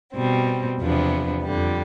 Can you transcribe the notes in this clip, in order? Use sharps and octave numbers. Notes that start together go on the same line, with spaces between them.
B2 G3 C4
E2 C3 F3 B3 D4
F2 D3 G3